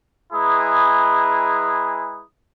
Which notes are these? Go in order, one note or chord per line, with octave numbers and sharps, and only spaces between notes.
G#3 E4 G#4 B4 A#5 D#6